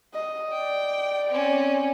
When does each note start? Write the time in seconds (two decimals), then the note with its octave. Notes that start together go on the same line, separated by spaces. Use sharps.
0.14 D#5
0.52 D5 G5
1.30 C4 C#4